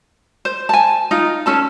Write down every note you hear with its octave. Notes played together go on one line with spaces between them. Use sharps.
C5
G#5 A5
D#4 F4
C#4 A4 A5